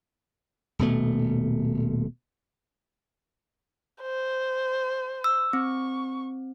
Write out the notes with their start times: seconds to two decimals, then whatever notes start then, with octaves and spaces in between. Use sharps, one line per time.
0.79 D#1 B2 A3
4.02 C5
5.24 E6
5.53 C4 C#6